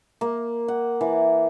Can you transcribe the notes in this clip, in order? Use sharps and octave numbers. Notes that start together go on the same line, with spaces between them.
A#3
F#5
E3